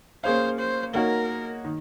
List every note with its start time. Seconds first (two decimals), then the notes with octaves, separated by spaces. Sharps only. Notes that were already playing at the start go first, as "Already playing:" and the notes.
0.24 A#3 C#4 G#4 C5 C#5 F5
0.59 C5
0.94 A#3 D#4 F#4 A#4 C#5
1.64 D#3